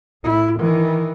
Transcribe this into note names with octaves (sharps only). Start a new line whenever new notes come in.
A2 E4
D#3 E3